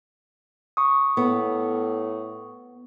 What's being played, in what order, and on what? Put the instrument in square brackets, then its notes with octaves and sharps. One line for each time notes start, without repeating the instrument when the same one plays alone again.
[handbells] C#6 D#6
[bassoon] A2 [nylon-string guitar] B3